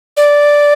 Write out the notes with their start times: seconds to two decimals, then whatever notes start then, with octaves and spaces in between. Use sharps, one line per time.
0.17 D5